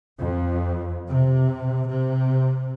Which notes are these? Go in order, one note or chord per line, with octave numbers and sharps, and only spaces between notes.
F2
C3
C3